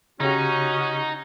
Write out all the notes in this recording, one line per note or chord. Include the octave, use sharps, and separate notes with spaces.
C#3 C#4 D#4 F#4 G4